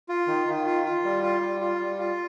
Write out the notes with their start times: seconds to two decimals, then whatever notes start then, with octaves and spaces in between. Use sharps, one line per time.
0.09 F4
0.27 D#3
0.47 D#3
0.66 F4
0.85 F4
1.04 G3
1.23 F4
1.41 G3
1.60 F4
1.80 G3
1.99 F4